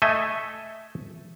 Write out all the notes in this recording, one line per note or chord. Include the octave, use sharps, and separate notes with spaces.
A3 A4 D#5 E5 G#5